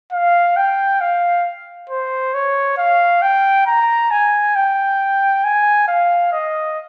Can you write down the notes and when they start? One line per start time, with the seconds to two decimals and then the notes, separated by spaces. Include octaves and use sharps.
0.12 F5
0.57 G5
1.01 F5
1.90 C5
2.34 C#5
2.78 F5
3.22 G5
3.67 A#5
4.11 G#5
4.56 G5
5.45 G#5
5.88 F5
6.32 D#5